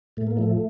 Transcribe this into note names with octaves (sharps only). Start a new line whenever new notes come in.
A2 A3
A#3
F3 A3